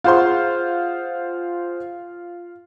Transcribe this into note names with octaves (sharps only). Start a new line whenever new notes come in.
F4 G#4 C5 F#5 C6